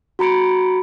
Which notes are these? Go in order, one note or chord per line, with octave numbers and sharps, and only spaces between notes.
F#4 A#5 B5 C#7 D7